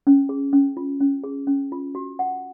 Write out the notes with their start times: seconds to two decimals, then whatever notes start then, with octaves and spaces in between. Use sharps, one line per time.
0.07 C#4
0.29 G#4
0.53 C#4
0.77 F4
1.01 C#4
1.24 G#4
1.47 C#4
1.72 F4
1.95 F#4
2.19 F#5